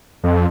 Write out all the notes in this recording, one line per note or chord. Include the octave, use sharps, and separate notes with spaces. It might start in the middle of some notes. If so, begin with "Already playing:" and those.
F2